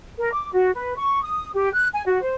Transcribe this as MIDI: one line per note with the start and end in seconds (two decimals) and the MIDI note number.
0.18 0.32 70
0.33 0.50 86
0.53 0.72 66
0.75 0.95 71
0.96 1.22 85
1.23 1.49 87
1.55 1.69 67
1.74 1.87 90
1.94 2.02 80
2.06 2.21 66
2.21 2.35 72